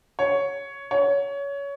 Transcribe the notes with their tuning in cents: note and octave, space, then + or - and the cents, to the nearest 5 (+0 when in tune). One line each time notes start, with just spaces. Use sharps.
C#5 +5
C#5 +20